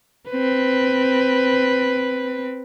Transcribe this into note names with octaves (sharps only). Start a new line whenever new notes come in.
C4 B4